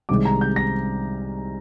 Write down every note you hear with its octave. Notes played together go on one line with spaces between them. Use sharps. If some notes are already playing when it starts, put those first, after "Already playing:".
C2 C3 D#3 G#3 D6
A#5
G6
A#6